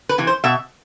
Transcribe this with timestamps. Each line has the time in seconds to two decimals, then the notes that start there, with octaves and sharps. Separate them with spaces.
0.09 B4
0.18 C3 E3
0.27 C5
0.44 B2 E5